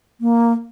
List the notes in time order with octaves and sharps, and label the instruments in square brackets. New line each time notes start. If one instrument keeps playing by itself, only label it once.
[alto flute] A#3